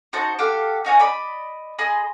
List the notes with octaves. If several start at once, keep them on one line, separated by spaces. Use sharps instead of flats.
D#4 F#4 C5 A5
G4 A4 F5 F#5
D#4 F#4 F5 G#5
D5 D#5 B5
G#4 D#5 B5 C6